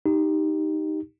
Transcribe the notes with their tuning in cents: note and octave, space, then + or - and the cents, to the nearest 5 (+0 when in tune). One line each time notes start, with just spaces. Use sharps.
D#4 +0 G4 +0